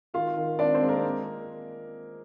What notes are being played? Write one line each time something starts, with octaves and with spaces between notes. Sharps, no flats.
D#3 F4 F5
D#3
C4 D4 D5
C4 C5
G#3
A#3 A#4
A#3